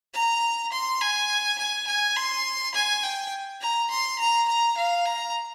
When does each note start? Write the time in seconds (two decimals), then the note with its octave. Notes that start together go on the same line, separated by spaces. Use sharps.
0.14 A#5
0.72 C6
1.01 G#5
1.58 G#5
1.87 G#5
2.16 C6
2.74 G#5
3.03 G5
3.61 A#5
3.91 C6
4.19 A#5
4.48 A#5
4.78 F5
5.06 A#5